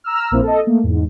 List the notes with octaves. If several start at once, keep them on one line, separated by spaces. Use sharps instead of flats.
A#5 E6 F6
A#1 A#3 C4 E4
A4 D#5
A3 A#3
E2 G#2